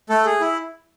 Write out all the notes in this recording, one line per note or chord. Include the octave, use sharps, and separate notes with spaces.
A3 A4
G#4
E4